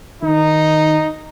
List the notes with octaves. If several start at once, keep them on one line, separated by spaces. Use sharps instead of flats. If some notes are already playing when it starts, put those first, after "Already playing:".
D#3 D#4